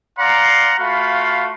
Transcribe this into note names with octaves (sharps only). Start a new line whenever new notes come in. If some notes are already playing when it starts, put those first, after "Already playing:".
D5 F5 F#5 A#5 C6
A3 F4 F#4 F5 B5